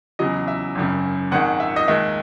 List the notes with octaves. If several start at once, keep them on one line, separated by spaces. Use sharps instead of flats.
E2 C#3 F#3 D#5
E5
G#1 F#2 C#3
G#1 G#2 D#3 G#3 F#5
E5
D#5
D#2 D#3 G#3 E5